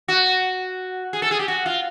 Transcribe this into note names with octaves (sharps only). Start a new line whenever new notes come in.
F#4
G#4
A4
G#4
G4
F#4
F4